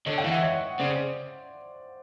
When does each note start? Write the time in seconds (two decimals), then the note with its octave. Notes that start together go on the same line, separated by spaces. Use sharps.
0.06 D3 C#5 D#5
0.18 F5 G5
0.24 E3
0.30 E5 F#5
0.42 C#5 D#5
0.79 C#3 C5 D5